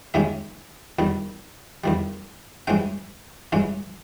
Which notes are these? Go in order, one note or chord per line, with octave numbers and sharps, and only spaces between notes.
D#2 D#3 G#3 C#4 E5
E2 D#3 G3
E2 D#3 G3
G2 E3 G#3 C#4 G5
G2 E3 G#3 C#4